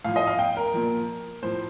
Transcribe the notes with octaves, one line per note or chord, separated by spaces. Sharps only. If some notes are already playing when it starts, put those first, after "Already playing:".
A2 F3 F5
D#5
F5
G5
A#4
A#2 F3
A2 F3 C5